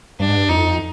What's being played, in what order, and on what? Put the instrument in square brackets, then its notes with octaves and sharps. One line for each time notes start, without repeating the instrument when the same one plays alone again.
[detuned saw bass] G2 [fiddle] D4
[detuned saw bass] G#2
G2
[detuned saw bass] F2 [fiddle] D#4